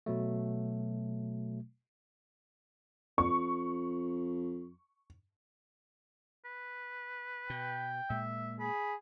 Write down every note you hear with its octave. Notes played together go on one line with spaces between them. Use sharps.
B2 F#3 A3
F2 C#6
B4
B2 G5
A#2 G#3 E5
G#4 B5